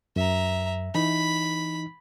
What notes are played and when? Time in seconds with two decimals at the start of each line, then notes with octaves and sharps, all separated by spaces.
0.16 F#2 E5 A#5
0.95 E3 D#4 B5